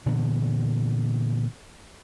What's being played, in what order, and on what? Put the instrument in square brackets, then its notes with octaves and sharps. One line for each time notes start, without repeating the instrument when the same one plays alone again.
[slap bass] A#2 D3 E3 B3